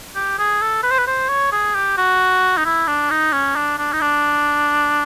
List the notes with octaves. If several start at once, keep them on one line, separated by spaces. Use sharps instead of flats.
G4
G#4
A4
B4
C5
B4
C5
C#5
G#4
G4
F#4
D#4
E4
D4
D#4
C#4
D4
D4
D#4
D4